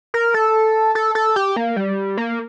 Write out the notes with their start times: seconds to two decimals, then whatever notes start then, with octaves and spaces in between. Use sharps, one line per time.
0.14 A#4
0.34 A4
0.95 A4
1.15 A4
1.36 G4
1.56 A#3
1.76 G3
2.17 A#3